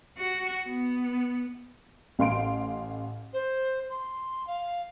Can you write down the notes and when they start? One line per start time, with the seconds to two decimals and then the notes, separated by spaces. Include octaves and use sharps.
0.18 F#4
0.67 B3
2.19 A1 F5 C6 D7
3.33 C5
3.89 C6
4.47 F5